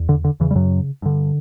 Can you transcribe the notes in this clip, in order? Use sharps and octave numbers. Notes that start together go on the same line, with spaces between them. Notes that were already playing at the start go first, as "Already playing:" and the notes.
Already playing: E2
D3
D3
E2 C#3 E3
G3
F#2 F#3
G2 D3